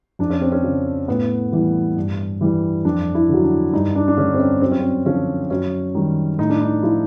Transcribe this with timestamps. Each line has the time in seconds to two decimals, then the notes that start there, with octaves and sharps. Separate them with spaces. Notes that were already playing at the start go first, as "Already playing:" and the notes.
0.19 F2 D4
0.30 C#4
0.41 C4
0.52 C#4
0.64 C#3 F3
1.08 A2 B3
1.52 E3 G3
1.96 G2
2.41 E3 G3
2.85 F2 D4
3.15 E4
3.29 D3 F#3
3.44 D4
3.73 G2 D#4
3.96 D4
4.08 D4
4.17 D3 G3 C#4
4.34 C4
4.40 C#4
4.61 F#2 C4
4.72 C#4
4.81 C4
5.06 D3 F3 C#4
5.50 F#2 C#4
5.95 D#3 G3
6.39 A2 D#4
6.50 D4
6.61 D#4
6.83 F3 E4